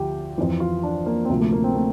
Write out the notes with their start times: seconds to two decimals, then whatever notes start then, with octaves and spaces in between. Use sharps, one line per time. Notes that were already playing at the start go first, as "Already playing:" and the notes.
Already playing: D2 D3 F3 G4
0.38 F2 E3 F4
0.60 F4
0.83 D4
1.06 A#3
1.25 C4
1.29 D2 C3 F3 A#3
1.41 A3
1.52 A#3
1.64 C4
1.75 A3